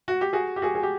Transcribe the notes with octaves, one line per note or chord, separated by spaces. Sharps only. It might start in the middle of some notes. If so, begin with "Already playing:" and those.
F#4
G4
F#4 G#4
G4
F#4 G#4
G#4
G4